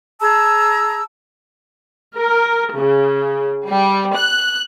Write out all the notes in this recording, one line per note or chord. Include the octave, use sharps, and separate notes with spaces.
G#4 A5 A#5 E6
A#4
C#3
G3
F#6